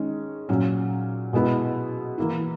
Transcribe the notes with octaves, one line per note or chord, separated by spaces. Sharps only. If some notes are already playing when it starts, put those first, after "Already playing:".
Already playing: D#3 G#3 C#4
A#2 F#3 C#4
B2 G#3 B3 E4
E3 A#3 E4